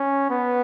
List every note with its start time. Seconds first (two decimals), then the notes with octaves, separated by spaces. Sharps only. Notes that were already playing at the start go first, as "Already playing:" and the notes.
Already playing: C#4
0.30 B3